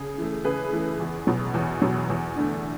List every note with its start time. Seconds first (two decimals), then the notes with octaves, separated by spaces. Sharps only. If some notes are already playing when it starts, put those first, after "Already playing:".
Already playing: C#3 G#4
0.18 E3 A3
0.44 C#3 G#4 B4
0.72 E3 A3
1.00 E2
1.27 B2 F#3
1.54 E2
1.82 B2 F#3
2.10 E2
2.36 D3 A3 D4